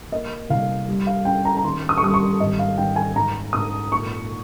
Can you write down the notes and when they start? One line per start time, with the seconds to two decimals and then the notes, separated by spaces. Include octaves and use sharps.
0.12 A#3 D#5
0.50 C2 F5
0.88 G3
1.07 F5
1.25 C#4 G5
1.45 A#5
1.57 A#5
1.64 D#2 C6
1.89 D#6
1.98 C#6
2.02 G3 D#6
2.14 C#6
2.40 G#1 D#5
2.59 F5
2.78 G#1 G5
2.96 G#5
3.16 G#2 A#5
3.53 G#2 D#6
3.92 A#2 C#6